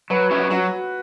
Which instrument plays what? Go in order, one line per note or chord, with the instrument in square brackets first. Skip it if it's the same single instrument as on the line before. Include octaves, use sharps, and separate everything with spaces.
[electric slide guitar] F#3 [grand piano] B4
[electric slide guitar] C#4 F#4 C#5 E5
[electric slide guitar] F#3 [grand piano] F#4